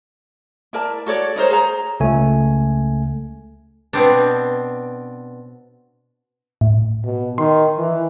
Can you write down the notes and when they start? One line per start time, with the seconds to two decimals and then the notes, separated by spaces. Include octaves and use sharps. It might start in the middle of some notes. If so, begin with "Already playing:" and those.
0.73 E4 A#4 D5 A5
1.06 F#4 A4 C#5 D5
1.36 D#4 A#4 C5 C#5
1.50 G#4 A#5
2.00 C#2 C#3 A3 G#5
3.93 B2 B3 C4 D4
6.61 A2
7.05 B2
7.38 D#3 C6
7.78 E3